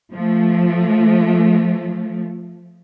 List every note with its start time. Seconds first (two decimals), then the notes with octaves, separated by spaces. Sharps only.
0.12 F3 A3